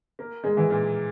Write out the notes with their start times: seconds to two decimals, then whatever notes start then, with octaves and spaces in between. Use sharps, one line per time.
0.19 A#3
0.44 G#3
0.57 E3
0.70 A#2